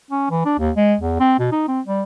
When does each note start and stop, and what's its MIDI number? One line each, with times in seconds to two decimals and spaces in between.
0.11 0.30 61
0.30 0.45 52
0.45 0.54 62
0.59 0.71 39
0.76 0.95 56
1.01 1.19 40
1.20 1.35 60
1.39 1.50 47
1.52 1.64 63
1.68 1.80 60
1.87 2.03 55